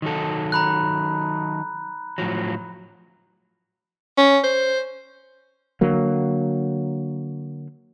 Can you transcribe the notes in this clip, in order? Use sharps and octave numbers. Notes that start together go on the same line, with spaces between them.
D#3 F#3 A4
A#5 B5 F#6
A2 F3 F#3
C#4
C5
D3 F#3 A#3